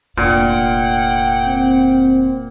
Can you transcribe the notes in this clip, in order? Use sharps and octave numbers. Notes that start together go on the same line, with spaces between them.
F1 A#2 D4 F#5 G5
C4